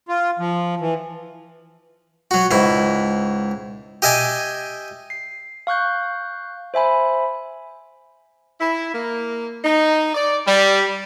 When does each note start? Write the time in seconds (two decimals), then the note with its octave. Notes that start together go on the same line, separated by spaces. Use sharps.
0.08 F4
0.39 F3
0.81 E3
2.31 F#3 F#4
2.51 C#2 G#2 E4
4.02 G4 D#5 E5 G#5 D6
5.10 C7
5.67 F5 C#6 F#6 G6
6.74 C5 E5 G#5 B5
8.61 E4
8.94 A#3
9.65 D#4
10.15 D5
10.47 G3